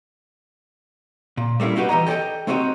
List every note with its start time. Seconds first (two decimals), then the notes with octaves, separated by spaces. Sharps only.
1.37 A#2
1.60 G3 A3 A#3 C#4 E4
1.76 C#4 D#4 F#4 G4 B4
1.89 E3 G4 D#5 A#5
2.06 G4 A4 C#5 D#5 G5
2.47 A3 C4 D#4 F#4 G4 D#5